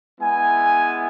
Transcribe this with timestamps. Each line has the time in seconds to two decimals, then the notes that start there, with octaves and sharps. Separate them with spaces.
0.20 G#3 B3 E4 G#5